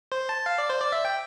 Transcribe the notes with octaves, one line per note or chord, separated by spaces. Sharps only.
C5
A5
F5
D5
C5
D5
E5
G5